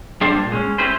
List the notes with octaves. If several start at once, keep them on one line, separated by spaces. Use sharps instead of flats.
G3 G#3 D4 C5
A#2
G#3 C4 C#4
C4 C#4 E4 G4 B4 C5